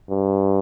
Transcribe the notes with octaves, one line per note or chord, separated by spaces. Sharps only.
G2